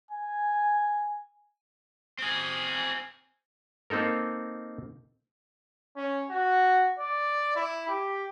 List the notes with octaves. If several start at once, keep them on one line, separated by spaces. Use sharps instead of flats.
G#5
C4 G#4
A#3 C4 D#4 A4 A#4
C#4
F#4
D5
E4
G4